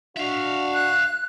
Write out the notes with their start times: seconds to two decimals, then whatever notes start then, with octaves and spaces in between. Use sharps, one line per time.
0.17 D4 F#4 E5 F5
0.72 F#6